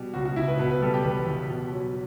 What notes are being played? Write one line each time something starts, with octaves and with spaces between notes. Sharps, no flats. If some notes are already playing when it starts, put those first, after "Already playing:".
Already playing: B2 G3
C#2 F#4
F#4
C#2 E4
B4
B2 B4
B4
G3 A4
G4
E2 B4
E2
B2
F#3